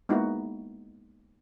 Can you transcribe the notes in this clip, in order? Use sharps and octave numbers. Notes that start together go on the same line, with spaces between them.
G#3 A#3 B3 D#4 E4 F#4